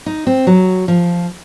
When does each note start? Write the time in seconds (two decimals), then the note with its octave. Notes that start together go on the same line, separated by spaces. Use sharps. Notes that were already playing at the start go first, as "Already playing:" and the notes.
0.06 D#4
0.27 C4
0.47 F#3
0.88 F3